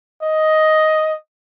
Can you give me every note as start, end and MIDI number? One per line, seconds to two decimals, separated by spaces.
0.23 1.14 75